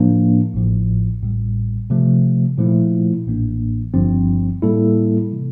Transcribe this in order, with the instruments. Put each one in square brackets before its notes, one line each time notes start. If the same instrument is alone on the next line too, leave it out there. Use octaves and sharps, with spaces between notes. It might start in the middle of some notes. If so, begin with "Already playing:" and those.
Already playing: [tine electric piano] A2 F3 A#3 D4
A1 A2 F3
A1 A2 G3
C3 F3 A3
A#2 F3 A3 E4
A1 A2 E3 A#3 D4
G1 G2 F3 C4
A2 G3 A#3 E4 A4
C3 E3